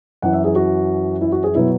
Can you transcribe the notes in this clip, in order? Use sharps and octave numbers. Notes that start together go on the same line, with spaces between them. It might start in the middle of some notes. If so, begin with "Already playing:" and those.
F#2 E3 F#5
E5
G#4
F#4
E4
F#4
G#4
B2 F#3 E4